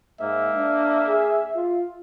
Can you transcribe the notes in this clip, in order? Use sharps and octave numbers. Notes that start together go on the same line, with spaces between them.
G#2 A#3 E5
D4
G#4
F4